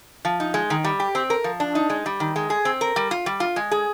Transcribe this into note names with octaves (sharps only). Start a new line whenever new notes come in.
F3
D#4
G#3
D#3
G3
G4
C4
A#4
F3
D4
D#4
G#3
G3
D#3
G#3
G#4
C4
A#4
G3
F4
G3
F4
G#3
G#4